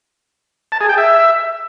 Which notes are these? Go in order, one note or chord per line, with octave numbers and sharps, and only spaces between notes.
A5
G#4
G5
E5